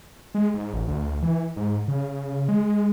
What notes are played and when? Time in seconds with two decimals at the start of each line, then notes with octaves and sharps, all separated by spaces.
0.34 G#3
0.54 G#2
0.74 A1
0.88 D2
1.22 E3
1.56 G#2
1.88 C#3
2.49 G#3